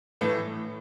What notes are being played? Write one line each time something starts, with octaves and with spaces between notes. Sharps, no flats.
A2 E3 A3